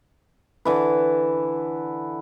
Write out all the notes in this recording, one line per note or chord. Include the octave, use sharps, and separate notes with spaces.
D3 E3 B4